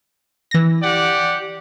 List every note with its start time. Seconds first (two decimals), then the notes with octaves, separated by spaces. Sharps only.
0.51 E3 A#6
0.83 G4 D5 F#5